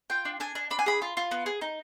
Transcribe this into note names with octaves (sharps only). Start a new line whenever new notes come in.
F4 G5
D4
D4 G#5
D4
D4 B5
G#5
G#4 B5
F4
F4
B3
G#4
D#4